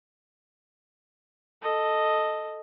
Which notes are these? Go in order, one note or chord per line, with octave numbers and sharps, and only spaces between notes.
A4 D#5